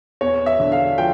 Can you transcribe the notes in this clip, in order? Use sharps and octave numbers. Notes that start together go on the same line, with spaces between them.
E2 C#5
E5
D3
F5
F3 G5